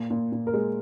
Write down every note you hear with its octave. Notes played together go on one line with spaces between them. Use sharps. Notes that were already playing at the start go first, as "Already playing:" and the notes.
Already playing: A#2
A#2
A#2
A#4
G#3